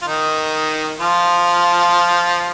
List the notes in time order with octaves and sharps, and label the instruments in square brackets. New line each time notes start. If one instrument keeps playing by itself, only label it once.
[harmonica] F4
D#3 D#4
F3 F4